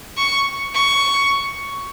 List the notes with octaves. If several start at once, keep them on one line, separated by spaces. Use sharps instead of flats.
C#6
C#6